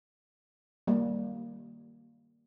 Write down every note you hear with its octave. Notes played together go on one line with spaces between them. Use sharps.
G3 A#3